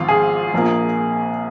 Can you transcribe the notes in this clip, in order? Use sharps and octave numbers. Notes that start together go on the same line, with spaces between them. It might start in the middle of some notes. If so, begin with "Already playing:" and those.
Already playing: G#1 G#2 F3 F4
G#4
A#1 A#2 A#3